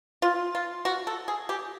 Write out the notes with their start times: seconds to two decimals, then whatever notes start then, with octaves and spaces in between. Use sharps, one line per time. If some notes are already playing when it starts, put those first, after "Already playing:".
0.22 F4
0.55 F4
0.85 F#4
1.07 A4
1.28 G#4
1.49 G4